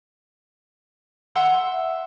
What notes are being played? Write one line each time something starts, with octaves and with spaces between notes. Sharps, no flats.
E5 F#5 C6